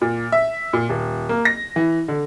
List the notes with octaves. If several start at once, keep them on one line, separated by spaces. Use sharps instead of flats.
A#2
E5
A#2
D#1
A#3
A#6
E3
D3